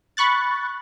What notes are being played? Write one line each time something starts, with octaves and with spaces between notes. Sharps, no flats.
B5 C#6 F#6 A6